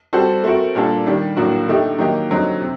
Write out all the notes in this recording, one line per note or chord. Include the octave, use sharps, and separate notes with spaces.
G3 C4 F#4 A4 C5
A3 C4 F#4 A#4
A#2 G3 D4 A4
D#3 G3 D4
A2 F#3 A#3 D4 F#4
D3 A3 D#4 G4
D#3 F#3 A#3 D#4 G4
D3 F#3 C4 D#4
C3